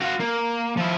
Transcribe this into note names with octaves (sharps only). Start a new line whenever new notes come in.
F#4 F5
A#3
F3 E4